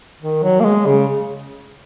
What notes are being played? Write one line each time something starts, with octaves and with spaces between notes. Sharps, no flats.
D#3
F#3
A#3
G#3
C#3